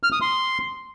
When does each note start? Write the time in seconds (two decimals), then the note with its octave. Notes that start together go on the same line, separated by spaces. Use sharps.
0.03 F6
0.12 D#6
0.21 C6